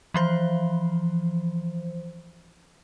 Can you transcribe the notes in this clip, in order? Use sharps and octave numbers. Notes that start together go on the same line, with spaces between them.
E3 F3 C5